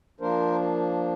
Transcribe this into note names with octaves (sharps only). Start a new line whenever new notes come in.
F3 A#3 D4 A#4 C5